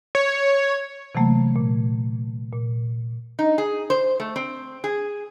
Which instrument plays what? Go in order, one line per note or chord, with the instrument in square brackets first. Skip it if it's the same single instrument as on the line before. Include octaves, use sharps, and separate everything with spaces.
[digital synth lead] C#5
[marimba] C3 E3 F#3 A3 A#3
A#2
A#2
[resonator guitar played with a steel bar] D#4
G#4
C5
A3
C4
G#4